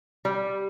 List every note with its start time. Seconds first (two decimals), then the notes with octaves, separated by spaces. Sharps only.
0.25 G3